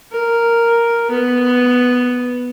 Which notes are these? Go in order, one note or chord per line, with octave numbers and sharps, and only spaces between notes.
A#4
B3